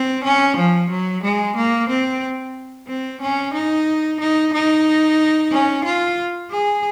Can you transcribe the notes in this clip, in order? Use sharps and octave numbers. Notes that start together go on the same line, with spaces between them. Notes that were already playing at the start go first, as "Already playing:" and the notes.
Already playing: C4
C#4
F3
F#3
G#3
A#3
C4
C4
C#4
D#4
D#4
D#4
C#4
F4
G#4